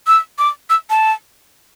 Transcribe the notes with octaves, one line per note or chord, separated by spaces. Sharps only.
E6
D6
E6
A5